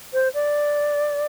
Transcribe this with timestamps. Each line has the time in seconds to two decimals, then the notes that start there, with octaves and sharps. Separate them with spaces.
0.13 C5
0.34 D5